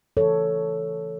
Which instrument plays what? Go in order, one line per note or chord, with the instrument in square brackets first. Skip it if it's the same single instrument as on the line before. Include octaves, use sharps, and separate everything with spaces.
[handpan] C#3 E3 A3 A4 C#5